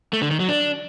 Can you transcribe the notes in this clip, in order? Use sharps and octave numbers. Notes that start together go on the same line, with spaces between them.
A3
D3
D#3
F#3
D4